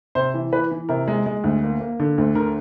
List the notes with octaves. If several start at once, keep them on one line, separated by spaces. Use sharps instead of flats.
C3 C5
E3
E3 B4
E3
C3 A#4
G#3
G#3
D2
A#3
A#3
D3
D2
D3 A#4